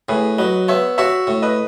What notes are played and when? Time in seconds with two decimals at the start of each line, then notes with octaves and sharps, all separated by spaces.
0.09 A2 G#4 B4
0.38 F#3 B4 D#5
0.68 B3 C#5 E5
0.98 F#4 C#5 E5
1.27 A2
1.42 B4 D#5